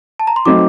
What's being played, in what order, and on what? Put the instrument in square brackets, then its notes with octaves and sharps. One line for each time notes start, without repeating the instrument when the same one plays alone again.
[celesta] A5
A#5
C6
[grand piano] F#3 A3 C4 D#4 [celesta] D6